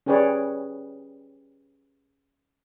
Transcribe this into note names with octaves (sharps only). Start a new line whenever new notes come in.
C#4 G4 G#4 B4 C#5 D5